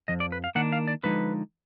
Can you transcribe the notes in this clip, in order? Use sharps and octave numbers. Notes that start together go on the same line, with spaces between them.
F2 F3 D#5
D5
B4
F5
D#3 A#3 D4 F#5
F5
D5
D3 F3 G#3 D#4 B4